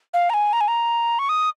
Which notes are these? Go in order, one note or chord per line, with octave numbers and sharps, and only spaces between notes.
F5
A#5
G#5
A#5
G#5
A#5
C#6
D#6